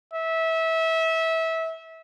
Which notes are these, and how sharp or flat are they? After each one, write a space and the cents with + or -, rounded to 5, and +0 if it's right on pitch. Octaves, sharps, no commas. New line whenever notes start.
E5 -25